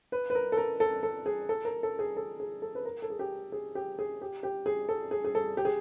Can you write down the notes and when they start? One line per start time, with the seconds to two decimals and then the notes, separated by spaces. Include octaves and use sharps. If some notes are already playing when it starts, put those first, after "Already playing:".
0.12 B4
0.30 B4
0.35 A#4
0.52 A4
0.57 A#4
0.80 A4
1.03 A4
1.26 G#4
1.49 A4
1.65 A#4
1.83 A4
1.99 G#4
2.17 A4
2.40 G#4
2.62 A4
2.75 B4
2.85 A#4
3.02 A4
3.10 G#4
3.19 G4
3.52 G#4
3.75 G4
3.99 G#4
4.21 G4
4.43 G4
4.66 G#4
4.89 A4
5.11 G#4
5.24 G#4
5.35 A4
5.57 G4
5.65 G#4